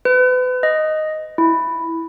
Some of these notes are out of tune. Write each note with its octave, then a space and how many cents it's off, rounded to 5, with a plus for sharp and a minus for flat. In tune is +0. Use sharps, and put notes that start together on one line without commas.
B4 +35
D#5 +0
E4 +0